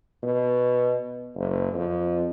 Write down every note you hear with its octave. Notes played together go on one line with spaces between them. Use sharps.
B2
F#1
F2